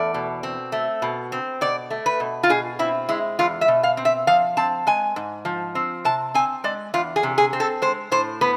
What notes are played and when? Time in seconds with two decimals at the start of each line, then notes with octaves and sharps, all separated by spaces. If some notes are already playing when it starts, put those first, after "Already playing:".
Already playing: E2 A3 D5
0.14 B2
0.43 C4
0.72 A3
1.02 B2
1.32 C4
1.61 B2 D5
1.90 A3
2.06 B4
2.20 B2
2.43 F4
2.49 B2 G#4
2.79 C4 E4
3.09 G#3 E4
3.39 E2 F4
3.61 E5
3.68 B2
3.83 F5
3.97 C4
4.05 E5
4.27 F3 F5
4.57 C4 A5
4.87 G#3 G#5
5.16 G#2
5.45 F3
5.75 C4
6.05 C3 A5
6.34 C4 G#5
6.64 G#3 D5
6.94 E2 F4
7.16 G#4
7.23 C3
7.38 G#4
7.53 C4
7.60 A4
7.82 G#3 C5
8.12 A2 C5
8.41 B3 B4